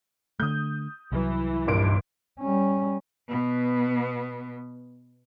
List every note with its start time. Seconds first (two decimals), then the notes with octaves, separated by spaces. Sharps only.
0.40 D3 A3 D#6 G6
1.12 C2 E3 F#3
1.67 G#1 G2 A#2 D7
2.40 G3 C#4
3.29 B2 B3